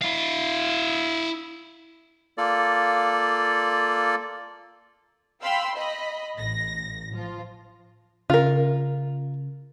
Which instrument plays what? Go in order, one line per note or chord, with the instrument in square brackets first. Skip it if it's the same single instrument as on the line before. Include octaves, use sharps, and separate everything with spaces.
[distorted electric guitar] E4 F5
[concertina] A#3 F4 A4 D5
[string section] F5 G5 B5 C6 E6
D#5 B5
A1 A#6
F3 F4
[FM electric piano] C#3 [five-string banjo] F4 A#4